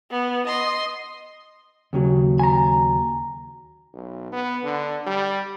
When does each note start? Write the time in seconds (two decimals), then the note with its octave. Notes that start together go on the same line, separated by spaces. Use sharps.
0.11 B3
0.47 D#5 C6
1.93 D#2 C#3 F#3
2.39 G#5 A#5
3.94 B1
4.32 B3
4.64 D3
5.07 G3